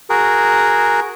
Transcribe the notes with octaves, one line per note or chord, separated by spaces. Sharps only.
F#4 G#4 A#4